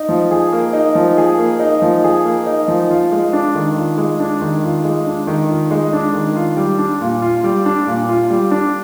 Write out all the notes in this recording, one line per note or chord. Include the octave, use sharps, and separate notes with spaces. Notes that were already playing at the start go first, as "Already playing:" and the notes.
Already playing: D#4
F3
G#4
A#3
D#4
F3
G#4
A#3
D#4
F3
G#4
A#3
D#4
F3
F4
G#3
D4
D#3
F4
G#3
D4
D#3
F4
G#3
D4
D#3
F4
G#3
D4
D#3
F4
G3
D4
A#2
F4
G3
D4
A#2
F4
G3
D4